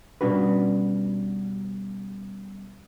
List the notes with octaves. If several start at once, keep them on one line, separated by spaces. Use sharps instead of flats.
B2 G3 C#4 D4 F#4 B4